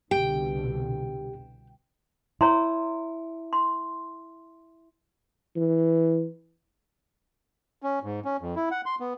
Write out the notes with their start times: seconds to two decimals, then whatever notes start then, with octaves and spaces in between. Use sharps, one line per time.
0.11 C2 B2 D3 G4 G5
2.41 E4 C#5 A#5 C6
3.53 C6
5.56 E3
7.82 C#4
8.03 G#2
8.25 C#4
8.41 F2
8.56 E4
8.71 F#5
8.86 C6
9.00 B3